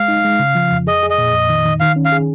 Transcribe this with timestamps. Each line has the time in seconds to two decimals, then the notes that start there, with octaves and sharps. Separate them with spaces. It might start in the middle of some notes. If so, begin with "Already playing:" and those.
Already playing: G#3 F5
0.08 D#4
0.24 G#3
0.39 C#3
0.55 F3
0.72 F2
0.87 G#4 D#5
1.03 G#4
1.10 D#5
1.18 A#2
1.34 F2
1.49 D#3
1.65 D#3
1.80 D#3 F5
1.96 C#4
2.05 F5
2.12 G#4